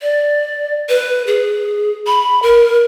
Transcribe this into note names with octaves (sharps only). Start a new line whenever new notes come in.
D5
B4
G#4
B5
A#4